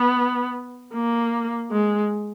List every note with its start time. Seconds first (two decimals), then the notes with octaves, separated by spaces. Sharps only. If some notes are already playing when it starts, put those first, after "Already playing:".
Already playing: B3
0.94 A#3
1.71 G#3